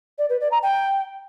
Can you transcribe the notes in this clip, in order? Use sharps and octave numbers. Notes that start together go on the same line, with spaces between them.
D5
B4
D5
A#5
G5